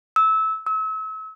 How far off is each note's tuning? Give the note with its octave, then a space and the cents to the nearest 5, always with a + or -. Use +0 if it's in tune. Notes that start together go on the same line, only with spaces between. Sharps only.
E6 -20
E6 -35